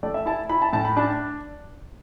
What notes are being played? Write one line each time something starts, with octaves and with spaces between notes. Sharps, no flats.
A3 D5
E5
E4 A5
E4 B5
A5
A2 A5
B5
D4 A5